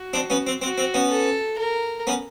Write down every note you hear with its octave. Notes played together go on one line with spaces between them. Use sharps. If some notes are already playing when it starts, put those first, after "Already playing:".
Already playing: F#4
C4 D4
B3 C#4
C4
C4 F#4
C4
B3 C#4
A4
A#4
B3 C#4